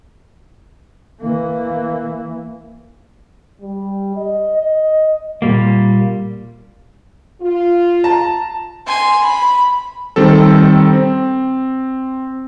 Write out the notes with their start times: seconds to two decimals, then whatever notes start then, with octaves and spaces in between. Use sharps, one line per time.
1.21 E3 A#3
3.61 G3
4.16 D#5
4.57 D#5
5.42 A#2 G3 A#3
7.41 F4
8.04 A5 A#5
8.87 G#5 C6
9.22 B5
10.16 D#3 G3 C4 A4
10.93 C4